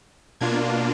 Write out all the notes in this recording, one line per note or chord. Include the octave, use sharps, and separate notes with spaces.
B2 A#3 D4 F4 G#6